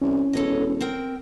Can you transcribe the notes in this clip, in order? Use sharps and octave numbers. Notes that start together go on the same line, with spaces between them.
C2 C#4
E1 A4 C#5 D#5
C4 A#4 G5